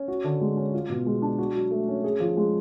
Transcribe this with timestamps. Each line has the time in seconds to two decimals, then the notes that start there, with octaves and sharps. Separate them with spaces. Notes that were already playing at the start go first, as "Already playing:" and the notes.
Already playing: C#4
0.08 F#4
0.24 D3
0.41 G#3
0.57 C#4
0.74 F4
0.89 B2
1.06 G#3
1.22 D4
1.39 F#4
1.55 F#3
1.71 A3
1.88 C#4
2.04 G#4
2.20 F3
2.37 G#3